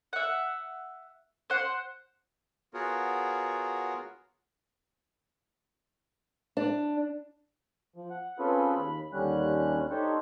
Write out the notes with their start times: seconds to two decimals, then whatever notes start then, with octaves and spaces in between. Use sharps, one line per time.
0.13 E5 F#5
1.50 C5 F#5
2.74 B3 F4 F#4 G#4 A#4 C#5
6.57 D4
7.96 F3
8.10 F#5
8.39 C4 C#4 F4 G#4 A4 B4
8.75 D#2 B5
9.13 D#2 D3 G3 C#4 F#6
9.91 D4 D#4 G4 A4 C5 C#5